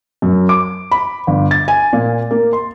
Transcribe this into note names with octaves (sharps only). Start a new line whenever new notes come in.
F#2
D6
B5
G1
A6
G#5
A#2
A#3
C6